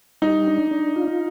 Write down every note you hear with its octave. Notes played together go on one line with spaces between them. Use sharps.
G3 D#4
D4
D4
F4